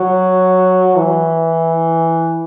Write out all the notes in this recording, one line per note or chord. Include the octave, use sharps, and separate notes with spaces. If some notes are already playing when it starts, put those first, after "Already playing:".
Already playing: F#3
E3